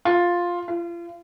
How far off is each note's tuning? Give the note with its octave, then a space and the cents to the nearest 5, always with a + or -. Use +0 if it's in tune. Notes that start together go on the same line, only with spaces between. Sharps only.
F4 +5
F4 -35